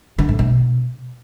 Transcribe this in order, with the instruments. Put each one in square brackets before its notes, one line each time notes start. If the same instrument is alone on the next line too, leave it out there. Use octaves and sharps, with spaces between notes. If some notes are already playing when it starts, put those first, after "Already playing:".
[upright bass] D3
A2
B2